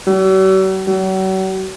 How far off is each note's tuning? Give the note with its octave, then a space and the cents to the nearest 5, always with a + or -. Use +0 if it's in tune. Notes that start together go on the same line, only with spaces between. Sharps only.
F#3 +45
F#3 +40